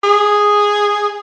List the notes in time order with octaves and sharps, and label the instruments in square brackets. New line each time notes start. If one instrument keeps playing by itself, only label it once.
[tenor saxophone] G#4